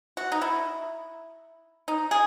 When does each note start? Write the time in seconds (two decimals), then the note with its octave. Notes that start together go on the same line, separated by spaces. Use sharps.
0.17 F#4
0.32 D#4
0.41 E4
1.88 D#4
2.11 G#4